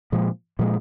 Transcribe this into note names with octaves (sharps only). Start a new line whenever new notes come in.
A#2 F3 G#3
A#2 F3 G#3